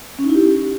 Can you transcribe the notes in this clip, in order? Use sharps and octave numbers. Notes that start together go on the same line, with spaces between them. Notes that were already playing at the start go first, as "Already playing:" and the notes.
C#4
D#4
E4
G4